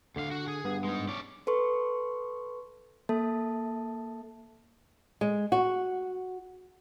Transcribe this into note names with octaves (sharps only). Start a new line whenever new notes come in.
D2 D3 F5
F#4 F#5
G#4
G2 B3
G#3 D#4
C#4 D5
A4 B4 C6 C#6
A#3 A4 E5 A5
G#3
F#4